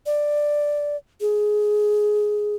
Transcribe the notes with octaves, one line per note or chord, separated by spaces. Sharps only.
D5
G#4